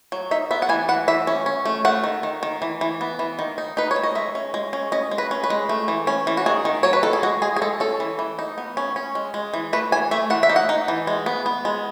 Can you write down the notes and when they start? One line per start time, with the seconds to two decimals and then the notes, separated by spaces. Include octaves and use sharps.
0.12 F#3
0.31 D#4 E5
0.51 B3 E5
0.62 F#5
0.69 E3 G#5
0.89 E3 F#5
1.08 E3 E5
1.27 C#4
1.46 C#4
1.65 A3
1.85 A3 F#5
2.04 D#3
2.23 D#3
2.43 D#3
2.62 E3
2.81 E3
3.01 B3
3.19 E3
3.39 D#3
3.58 D#4
3.77 D#4 B4
3.91 C#5
3.96 D#3
4.03 D#5
4.15 G#3 E5
4.35 C#4
4.54 G#3
4.73 C#4
4.92 C#4 D#5
5.11 G#3
5.18 B4
5.31 C#4
5.44 B4
5.50 G#3
5.69 A3
5.88 E3
6.07 C#4
6.27 E3
6.37 F#4
6.46 D#3 G#4
6.65 D#3
6.83 F#3 C#5
6.93 B4
7.03 D#3 A4
7.13 G#4
7.23 G#3 F#4
7.42 G#3 G#4
7.56 G#4
7.62 G#3 A4
7.80 C#4 A4
8.00 E3
8.19 E3
8.39 D#4
8.58 B3
8.77 C#4
8.96 C#4
9.15 G#3
9.34 G#3
9.54 E3
9.73 A3 B4
9.92 E3 G#5
10.11 A3 E5
10.30 E3 F#5
10.43 E5
10.49 D#4
10.56 F#5
10.69 D#4
10.88 E3
11.07 G#3
11.26 B3
11.46 B3
11.65 G#3